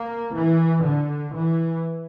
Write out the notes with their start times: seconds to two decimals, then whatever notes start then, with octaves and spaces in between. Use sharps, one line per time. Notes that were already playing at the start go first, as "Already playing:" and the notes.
Already playing: A#3
0.34 E3
0.84 D3
1.34 E3